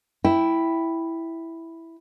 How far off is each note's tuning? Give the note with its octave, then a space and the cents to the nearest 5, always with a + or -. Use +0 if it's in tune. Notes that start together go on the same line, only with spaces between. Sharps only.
E4 +0 G5 +0